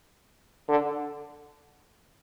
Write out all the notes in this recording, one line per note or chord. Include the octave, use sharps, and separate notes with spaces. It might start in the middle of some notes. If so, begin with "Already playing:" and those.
D3